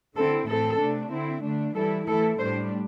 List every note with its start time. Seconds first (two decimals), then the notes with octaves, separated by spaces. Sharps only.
0.16 D3 C4 E4 A4
0.47 A2 E3 C4 A4
0.79 C3 A3 D4
1.11 D3 C4 E4
1.43 D3 A3 D4
1.74 E3 G3 E4 A4
2.06 E3 A3 E4 A4
2.38 A2 G3 D4 C5